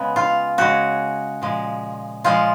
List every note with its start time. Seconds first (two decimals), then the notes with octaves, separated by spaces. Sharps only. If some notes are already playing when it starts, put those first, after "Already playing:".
Already playing: C#3 G#3 B3
0.16 F4
0.58 C#3 G#3 F#4
1.42 A#2 F3 G#3
2.24 A#2 F3 G#3 F4